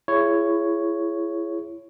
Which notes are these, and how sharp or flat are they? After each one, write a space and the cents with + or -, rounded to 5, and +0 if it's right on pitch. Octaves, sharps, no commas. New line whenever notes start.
E4 +30 G#4 +0 C#5 +0